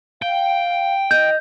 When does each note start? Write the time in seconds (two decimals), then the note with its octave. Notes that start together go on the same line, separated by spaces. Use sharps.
0.22 F5 G5
1.11 D#5 G6